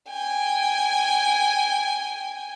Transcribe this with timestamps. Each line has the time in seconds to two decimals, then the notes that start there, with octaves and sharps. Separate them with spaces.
0.10 G5 G#5